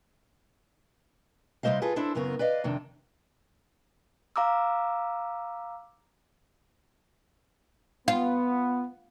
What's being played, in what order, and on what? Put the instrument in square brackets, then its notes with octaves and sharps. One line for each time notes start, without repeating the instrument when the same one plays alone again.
[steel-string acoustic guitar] C3 G3 C#4 C5 D#5 F5
F4 G#4 A4 B4
D4 E4 A4 C5
F#2 C#3 B3 C4 A#4
B4 D5 D#5 F5
F2 C3 D#3 D4
[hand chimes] F5 A#5 D6 E6
[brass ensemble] B3 [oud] F4